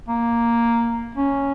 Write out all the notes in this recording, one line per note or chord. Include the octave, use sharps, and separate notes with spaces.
A#3
C#4